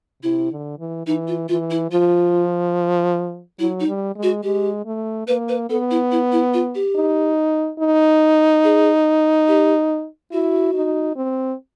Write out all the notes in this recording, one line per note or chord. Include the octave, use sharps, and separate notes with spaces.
C3 E4
D3
E3
E3 D#4
F4
E3 F4
E4
F3 F4
F#3 E4
D#4
G3
G#3
F#4
G#3 G4
A3
A#3 B4
B4
B3 A4
E4
E4
E4
F4
G4
D#4
D#4
G#4
G4
E4 F#4
D#4
C4